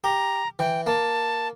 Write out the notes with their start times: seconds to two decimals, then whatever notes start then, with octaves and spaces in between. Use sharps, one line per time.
0.04 G4 A#5
0.59 E3 G5
0.86 A#3 A5